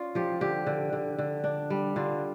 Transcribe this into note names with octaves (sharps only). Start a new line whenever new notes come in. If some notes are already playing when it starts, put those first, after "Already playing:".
Already playing: C#4 F4 D5
F3 G4
D3 G4
D3
D3
D3
D4
G3
D3 F4